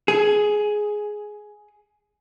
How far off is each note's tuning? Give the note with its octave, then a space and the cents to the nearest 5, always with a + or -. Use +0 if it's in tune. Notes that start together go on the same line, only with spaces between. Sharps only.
G#4 +10